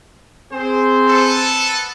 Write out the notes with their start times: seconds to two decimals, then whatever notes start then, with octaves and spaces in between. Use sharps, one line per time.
0.52 C4 G#4 C5
1.06 B3 A4